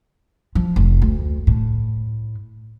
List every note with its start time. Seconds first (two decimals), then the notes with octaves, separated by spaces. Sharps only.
0.55 F3
0.76 F1
1.02 D2
1.47 A2